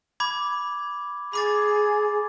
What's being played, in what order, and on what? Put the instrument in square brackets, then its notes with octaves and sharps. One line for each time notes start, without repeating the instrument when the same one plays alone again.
[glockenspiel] B5 D6 G#6
[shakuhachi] G#4 [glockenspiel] B5 D6 A6